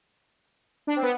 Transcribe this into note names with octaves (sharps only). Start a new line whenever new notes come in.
D4
C4
B3